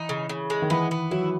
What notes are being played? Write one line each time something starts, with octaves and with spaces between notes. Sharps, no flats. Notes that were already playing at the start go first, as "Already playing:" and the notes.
Already playing: E3 D#4
C#3
C#3
G#3
D#3
E3 B3
B3
F#3 E4